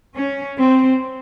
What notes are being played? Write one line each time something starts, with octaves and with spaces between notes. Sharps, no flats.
C#4
C4